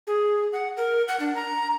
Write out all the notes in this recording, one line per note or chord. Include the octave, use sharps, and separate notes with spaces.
G#4
F#5
A#4
F#5
D4
A#5